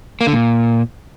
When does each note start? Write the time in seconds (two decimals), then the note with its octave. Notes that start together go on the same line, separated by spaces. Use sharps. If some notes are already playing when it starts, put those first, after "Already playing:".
0.21 A#3
0.27 D3
0.33 A#2